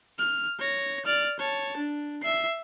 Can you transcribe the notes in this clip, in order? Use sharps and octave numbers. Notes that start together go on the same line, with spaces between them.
F6
C#5 A#6
D5 F6
C#5 A5
D4
E5 C7